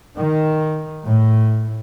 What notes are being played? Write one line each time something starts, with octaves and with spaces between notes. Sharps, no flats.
D#3
A2